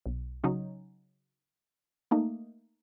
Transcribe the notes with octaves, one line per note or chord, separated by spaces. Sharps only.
B1
C#3 F#3 C#4 D#4
A3 A#3 D#4